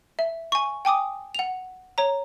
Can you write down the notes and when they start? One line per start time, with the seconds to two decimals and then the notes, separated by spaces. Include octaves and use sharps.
0.19 E5
0.52 G#5 C#6
0.85 G5 G#5 D6 D#6
1.35 F#5 F7
1.98 C#5 A#5